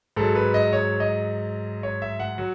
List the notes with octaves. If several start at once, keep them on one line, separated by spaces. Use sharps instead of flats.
G#2 F#3 A4
B4
D#5
C#5
D#5
C#5
E5
F#5
F#3